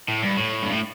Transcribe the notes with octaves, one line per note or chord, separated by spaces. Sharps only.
A2
G2
A2
G2
A2